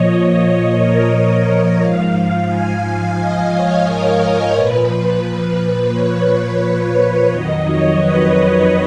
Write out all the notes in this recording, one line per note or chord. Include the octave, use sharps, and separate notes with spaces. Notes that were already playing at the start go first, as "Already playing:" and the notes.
Already playing: A#2 F3 C#5 D#5
C#5
A#4
C#5
D#5
G#2 F3 F5
G#5
F5
D#5
C#5
A#4
A#4
A#2 F3 B4
C#5
F2 D#3 F#3 D#5
C#5
B4